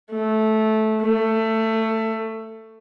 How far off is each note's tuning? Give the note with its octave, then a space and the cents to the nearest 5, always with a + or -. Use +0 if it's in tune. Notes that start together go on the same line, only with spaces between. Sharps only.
A3 -15
A3 +15